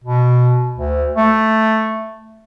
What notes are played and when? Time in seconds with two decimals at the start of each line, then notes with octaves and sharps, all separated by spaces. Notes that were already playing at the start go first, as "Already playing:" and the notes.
0.04 B2
0.75 D2
1.15 A3